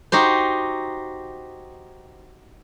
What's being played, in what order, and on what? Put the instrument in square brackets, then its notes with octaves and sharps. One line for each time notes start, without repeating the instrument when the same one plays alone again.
[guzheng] D#4 F#4 G4 C5